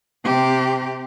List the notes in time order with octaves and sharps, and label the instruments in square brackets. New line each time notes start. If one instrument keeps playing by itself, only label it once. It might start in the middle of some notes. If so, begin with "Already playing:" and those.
[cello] C3 G4